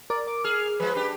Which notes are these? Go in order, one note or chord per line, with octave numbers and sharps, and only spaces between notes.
A#4 D5
D6
G#4 F6
F3 G#3 B4
D4 G4